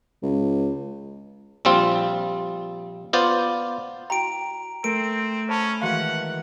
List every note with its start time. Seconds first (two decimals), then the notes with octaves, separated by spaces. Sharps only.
0.22 C#2
1.65 A#1 G3 C4 F4
3.13 B3 F4 C5 D5
4.10 E4 F#4 G5 A#5 D7
4.84 A3 C4 A#4 D7
5.49 C#4 C5 A5 B5
5.82 D#3 E3 G#3 F#4 F5 F#5